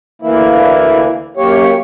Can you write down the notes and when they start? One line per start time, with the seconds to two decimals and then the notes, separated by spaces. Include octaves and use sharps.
0.22 D2 E3 A#3 E4
1.37 F#2 A#3 G4 C#5